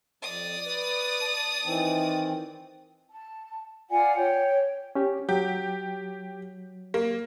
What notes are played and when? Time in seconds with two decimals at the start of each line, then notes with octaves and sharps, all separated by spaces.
0.22 F2 D5 D#6
0.65 B4
1.21 A5
1.64 D#3 E3 C4
3.10 A5
3.90 F4 D5 F#5 G#5
4.15 C#5 G5
4.95 C#4 G4
5.29 F#3 G4
6.94 A#3